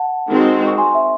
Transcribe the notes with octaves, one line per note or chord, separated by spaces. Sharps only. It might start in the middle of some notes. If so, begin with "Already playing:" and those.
Already playing: F#5 A5
D#3 G#3 C4 F#4
C#6
G#5 C6
E5